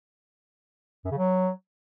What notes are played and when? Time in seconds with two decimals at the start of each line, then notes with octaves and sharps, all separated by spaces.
1.05 F#2
1.11 C#3
1.17 F#3